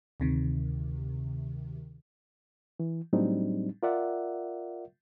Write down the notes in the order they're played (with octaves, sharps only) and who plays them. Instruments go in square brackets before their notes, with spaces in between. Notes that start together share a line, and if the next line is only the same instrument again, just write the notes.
[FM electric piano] D2 C3 D#3
[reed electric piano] E3
A2 F#3 G3 C4 D4 D#4
F4 A#4 D5 E5 F#5